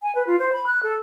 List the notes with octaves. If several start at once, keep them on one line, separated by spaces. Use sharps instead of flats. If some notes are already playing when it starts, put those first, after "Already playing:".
G#5
B4
F4
C5
B5
F#6
A4